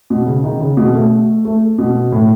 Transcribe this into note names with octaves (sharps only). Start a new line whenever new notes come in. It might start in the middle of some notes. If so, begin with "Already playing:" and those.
B2
C#3
D#3
C#3
B2
A3
A3
B2
A2